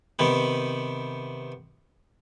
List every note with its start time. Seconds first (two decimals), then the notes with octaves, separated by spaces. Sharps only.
0.19 C3 D#3 B3